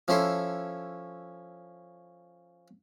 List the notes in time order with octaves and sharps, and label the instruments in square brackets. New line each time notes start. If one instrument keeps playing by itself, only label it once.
[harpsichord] F3 C#4 E4 A4 C6